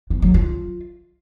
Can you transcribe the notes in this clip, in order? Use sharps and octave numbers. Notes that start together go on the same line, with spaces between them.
B3
F#3
F4